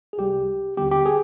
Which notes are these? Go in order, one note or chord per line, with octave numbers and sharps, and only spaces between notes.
G#4
C2 C3 G3 G4
D#2 D3 G3 B3 G4
G4
G#4